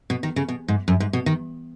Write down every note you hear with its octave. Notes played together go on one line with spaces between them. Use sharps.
B2
D#3
C#3
B2
G#2
F#2
G#2
B2
D#3